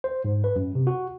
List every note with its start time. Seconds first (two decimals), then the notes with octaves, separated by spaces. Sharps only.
0.04 C5
0.24 G#2
0.44 B4
0.56 F#2
0.75 C3
0.87 F#4